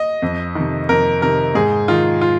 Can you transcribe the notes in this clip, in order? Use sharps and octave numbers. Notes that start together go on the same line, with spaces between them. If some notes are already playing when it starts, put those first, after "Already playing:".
Already playing: D#5
F2
C3 D#3
F2 A#4
C3 D#3 A#4
G#2 G#4
D#3 F4
F4